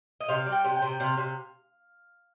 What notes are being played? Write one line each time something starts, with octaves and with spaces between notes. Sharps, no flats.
D#5
C3 F5
G3
G5
C3
G5
C3
C3 F5
C3